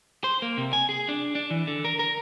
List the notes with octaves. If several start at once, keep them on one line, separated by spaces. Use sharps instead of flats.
C5
A#3
C3
G#5
G#4
D4
D4
E3
D3
A#4
A#4